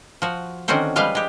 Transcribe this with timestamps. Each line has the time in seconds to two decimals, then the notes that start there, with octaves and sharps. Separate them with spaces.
0.22 F3 F#4
0.68 D3 D#3 C4 C#4 F#4 C5
0.96 F3 G3 G#3 B4 F5
1.15 G#3 G4